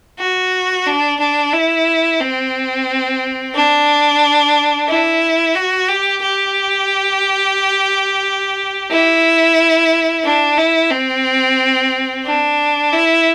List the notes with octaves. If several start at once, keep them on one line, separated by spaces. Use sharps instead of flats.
F#4
D4
D4
E4
C4
D4
E4
F#4
G4
G4
E4
D4
E4
C4
D4
E4